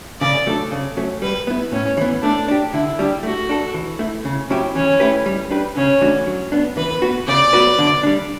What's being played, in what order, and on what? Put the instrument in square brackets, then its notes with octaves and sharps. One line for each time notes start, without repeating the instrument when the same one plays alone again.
[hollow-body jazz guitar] C#3 [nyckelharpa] D5
[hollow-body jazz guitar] F#3 A3 D4 A4
C#3
F#3 A3 C#4
[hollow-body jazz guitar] G3 [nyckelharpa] B4
[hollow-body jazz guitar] B3 E4
[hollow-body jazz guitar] A2 [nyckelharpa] C#4
[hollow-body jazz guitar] E3 B3
[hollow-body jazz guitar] A3 [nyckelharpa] D4
[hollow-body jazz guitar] D4 G4
[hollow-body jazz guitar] D3 [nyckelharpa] E4
[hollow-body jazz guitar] G3 D4 G4
[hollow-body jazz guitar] A3 [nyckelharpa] F#4
[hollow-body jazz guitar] D4 A4
E3
A3 E4
C#3
F#3 C#4 E4 G4
[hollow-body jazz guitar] E3 [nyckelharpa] C#4
[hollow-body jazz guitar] A3 E4 G4 B4
G3
D4 G4 B4
[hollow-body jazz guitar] C#3 [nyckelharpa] C#4
[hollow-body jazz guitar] E3 A3 D4 F#4
F#3
B3 D4
[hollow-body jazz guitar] E3 [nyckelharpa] B4
[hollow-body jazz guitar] B3 F#4
[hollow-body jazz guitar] C#3 [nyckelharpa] D5
[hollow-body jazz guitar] F#3 B3 F#4 B4
D3
G3 D4